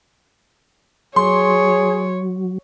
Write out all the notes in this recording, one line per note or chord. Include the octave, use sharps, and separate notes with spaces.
F#3 G#4 C#5 C6